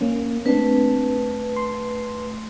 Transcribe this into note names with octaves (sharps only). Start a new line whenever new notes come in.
A#3 C#4
A3 C4 D4 B4
C6